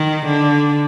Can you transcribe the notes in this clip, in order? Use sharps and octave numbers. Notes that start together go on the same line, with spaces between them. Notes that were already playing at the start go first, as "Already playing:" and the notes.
Already playing: D#3
D3